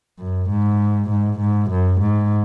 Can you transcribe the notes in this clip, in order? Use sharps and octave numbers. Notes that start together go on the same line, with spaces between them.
F#2
G#2
G#2
G#2
F#2
G#2